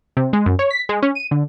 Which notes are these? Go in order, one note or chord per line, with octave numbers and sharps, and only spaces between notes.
C3
G#3
F#2
C#5
B6
G#3
C#4
D#7
D3